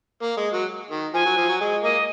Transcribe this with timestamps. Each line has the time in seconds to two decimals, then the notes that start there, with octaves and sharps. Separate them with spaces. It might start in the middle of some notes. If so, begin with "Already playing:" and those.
0.22 A#3
0.37 G#3
0.53 F#3
0.90 D#3
1.14 F3 G#5
1.26 F#3
1.37 F3
1.48 F#3
1.61 G#3
1.83 A#3 D#5